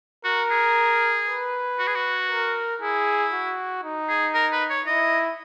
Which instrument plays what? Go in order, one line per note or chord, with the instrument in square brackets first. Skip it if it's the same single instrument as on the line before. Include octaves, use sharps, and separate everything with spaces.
[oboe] F#4 [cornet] A#4
[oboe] G#4
[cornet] B4
[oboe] F#4
G#4
F#4
[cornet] A#4
[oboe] E4 [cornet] G#4
[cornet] F#4
D#4
[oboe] G#4
A#4
B4
C#5
[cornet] E4 [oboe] D#5